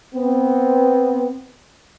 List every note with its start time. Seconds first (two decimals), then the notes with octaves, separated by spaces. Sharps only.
0.14 B3 C4